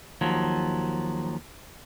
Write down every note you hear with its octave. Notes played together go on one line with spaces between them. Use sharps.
D#2 F3 F#3